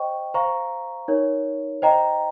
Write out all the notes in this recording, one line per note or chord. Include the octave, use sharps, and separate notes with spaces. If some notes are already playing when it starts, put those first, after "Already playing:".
Already playing: C5 D#5 G5 C#6
C5 F5 A#5 C#6
D#4 A#4 C#5
C5 D#5 G5 A#5